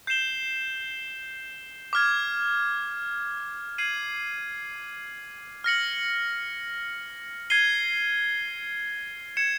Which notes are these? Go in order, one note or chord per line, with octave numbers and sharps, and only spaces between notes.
G6 C7 E7 G7
D6 F6 G#6
G#6 C7 D#7 F#7
F6 A#6 C#7 F#7
G#6 C7 D#7 G7
G#6 C#7 E7